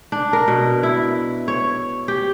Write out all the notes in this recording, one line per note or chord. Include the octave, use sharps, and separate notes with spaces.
D4
A#4
B2
E4
C#5
G4